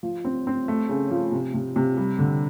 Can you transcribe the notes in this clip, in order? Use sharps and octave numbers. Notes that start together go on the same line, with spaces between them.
F3
C4
C4
A3
C#3
F3
C3
C3
C3
G3
D3